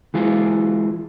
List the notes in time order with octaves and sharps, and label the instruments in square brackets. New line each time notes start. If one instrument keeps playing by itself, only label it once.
[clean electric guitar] E3 G#3 E4 F4